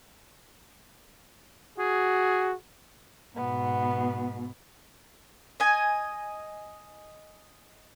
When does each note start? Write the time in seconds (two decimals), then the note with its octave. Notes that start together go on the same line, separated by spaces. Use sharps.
1.78 F#4 G#4
3.36 G#2 B2 B3
5.60 D#5 G#5